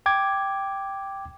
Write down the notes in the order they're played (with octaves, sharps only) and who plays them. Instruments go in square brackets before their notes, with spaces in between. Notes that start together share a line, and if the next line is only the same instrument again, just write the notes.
[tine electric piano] G5 D6 G#6